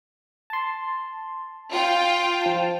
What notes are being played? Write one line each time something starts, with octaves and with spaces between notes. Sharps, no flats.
A5 C6
F4 G5
F3 A5